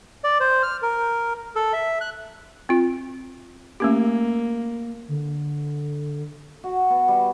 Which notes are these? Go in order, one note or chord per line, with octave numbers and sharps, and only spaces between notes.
D5
C5
F6
A#4
A4
E5
F#6
C4 F4
A3 A#3 C#4 G4
D3
F#4
B3
G3